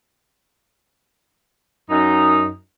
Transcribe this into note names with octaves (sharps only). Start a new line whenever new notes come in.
F#2 D#4